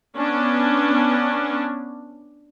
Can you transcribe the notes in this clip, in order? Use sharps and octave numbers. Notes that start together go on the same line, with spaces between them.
B3 C#4 D4